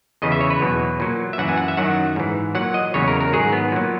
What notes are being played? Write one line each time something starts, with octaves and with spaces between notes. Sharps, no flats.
E2 C#3 E3 D#5
E5
C#5
B4
E2 B2 F#3
A#2 F#3
E5
F#2 E3 F#5
G#5
F#5
E5
F#2 D#3 F#3 F#5
G#2 E3
A#2 F#3 F#5
D#5
E2 C#3 F#3 C#5
A#4
A#4
G#2 D#3 F#3 G#4
B3
A#2 F#3